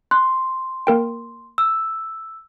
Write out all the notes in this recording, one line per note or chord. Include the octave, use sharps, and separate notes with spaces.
C6 F#6
A#3 A#4 G5
E6